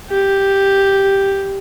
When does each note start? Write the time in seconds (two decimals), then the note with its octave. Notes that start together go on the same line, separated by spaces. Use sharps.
0.10 G4